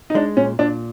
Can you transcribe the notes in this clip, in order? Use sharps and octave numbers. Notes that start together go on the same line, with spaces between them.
D#4
G#3 D4
A#2 C#4
A#2 D4